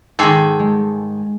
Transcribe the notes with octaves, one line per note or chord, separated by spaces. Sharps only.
G#2 D#3 G#4 A4 G5
G#3